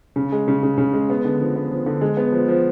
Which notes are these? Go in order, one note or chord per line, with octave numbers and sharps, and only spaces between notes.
C#3
G#3
C#3
C#3
C#3
G#3
B3
D3
F3
B3
F3
D3
G#3
B3
F3
F3